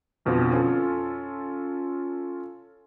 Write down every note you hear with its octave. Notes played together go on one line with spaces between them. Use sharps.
F2 B2 D3 F3
C#4 F4 A4